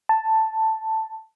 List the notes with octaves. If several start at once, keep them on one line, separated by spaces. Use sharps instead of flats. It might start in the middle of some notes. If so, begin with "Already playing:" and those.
A5